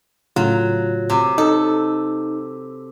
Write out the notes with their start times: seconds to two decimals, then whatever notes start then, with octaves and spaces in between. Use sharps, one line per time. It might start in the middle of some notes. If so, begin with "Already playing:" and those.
0.36 A2 C#3 F#3 F4
1.10 C3
1.38 D#4 A4